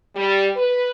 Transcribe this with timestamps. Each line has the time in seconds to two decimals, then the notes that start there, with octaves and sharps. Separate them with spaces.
0.16 G3
0.56 B4